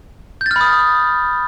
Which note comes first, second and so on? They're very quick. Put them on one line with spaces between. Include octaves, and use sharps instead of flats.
G6 A6 F6 B5 D#6